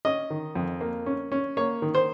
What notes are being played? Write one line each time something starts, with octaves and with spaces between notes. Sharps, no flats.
C#4 D#5
D#3
F2
A#3
C#4
C#4
A#3 C#5
D#3
C5